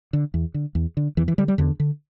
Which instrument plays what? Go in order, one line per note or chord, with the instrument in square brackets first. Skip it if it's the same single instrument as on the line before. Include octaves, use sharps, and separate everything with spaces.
[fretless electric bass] D3
E2
D3
E2
D3
E2 E3
E3
D3 G3
G3
E2 D3
D3